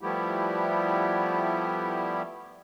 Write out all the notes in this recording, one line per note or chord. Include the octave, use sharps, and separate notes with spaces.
F3 G3 A3 B3 E4 G4